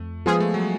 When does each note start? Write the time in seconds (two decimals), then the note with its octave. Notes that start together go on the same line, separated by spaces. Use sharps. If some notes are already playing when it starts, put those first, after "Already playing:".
Already playing: F2 A3
0.26 F3 G#3 B3 F4 G#4
0.40 A3
0.54 F#3